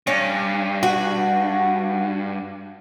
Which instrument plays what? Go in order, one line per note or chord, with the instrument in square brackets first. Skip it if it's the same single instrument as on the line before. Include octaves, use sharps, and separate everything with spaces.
[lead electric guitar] G2 [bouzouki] C#4
[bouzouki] F#4